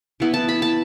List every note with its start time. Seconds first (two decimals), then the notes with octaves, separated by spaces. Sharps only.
0.20 E3 B3 E4
0.34 A5
0.49 B5
0.62 A5